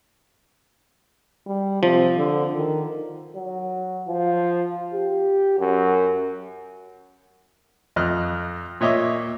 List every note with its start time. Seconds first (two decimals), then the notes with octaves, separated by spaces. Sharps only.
1.47 G3
1.83 C3 F3
2.16 D3
2.56 D#3
3.35 F#3
4.08 F3
4.94 G4
5.59 F#2
7.96 F2 D#5 F6 F#6
8.81 A#2 C#5 D#5 E5 D6